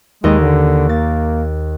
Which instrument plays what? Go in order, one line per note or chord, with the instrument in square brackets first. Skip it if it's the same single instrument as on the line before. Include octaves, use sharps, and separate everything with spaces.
[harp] D#2 D#5 [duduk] G#3
[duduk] D3
[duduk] A#3 [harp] A6